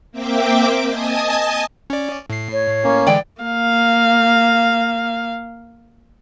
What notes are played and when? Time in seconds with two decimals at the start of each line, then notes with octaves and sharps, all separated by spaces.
0.12 A#3 C4 E5 G5 D6
0.86 D#5 G#5 A5 D#6
1.90 C#4 D5
2.30 A2 C7
2.52 C#5
2.84 A#3 C#4
3.07 D3 E3 G#3 D5 G5
3.42 A#3 F5